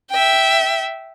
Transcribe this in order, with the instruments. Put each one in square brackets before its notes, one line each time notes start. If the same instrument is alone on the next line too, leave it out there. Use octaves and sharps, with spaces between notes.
[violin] E5 G5